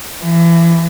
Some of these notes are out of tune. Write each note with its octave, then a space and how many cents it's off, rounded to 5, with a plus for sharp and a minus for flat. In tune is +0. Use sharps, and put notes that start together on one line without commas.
E3 +30